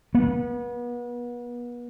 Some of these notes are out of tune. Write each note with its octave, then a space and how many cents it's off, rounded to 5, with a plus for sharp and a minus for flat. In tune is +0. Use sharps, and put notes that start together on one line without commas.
B3 -35